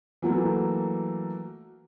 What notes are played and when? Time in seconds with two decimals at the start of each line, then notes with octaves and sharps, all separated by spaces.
0.22 E3 F#3 A3 A#3